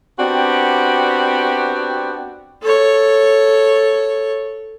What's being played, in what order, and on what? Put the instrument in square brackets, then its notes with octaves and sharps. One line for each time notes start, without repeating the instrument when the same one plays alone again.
[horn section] B3 C4 D4 F#4 G4 G5
[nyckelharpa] A4 C#5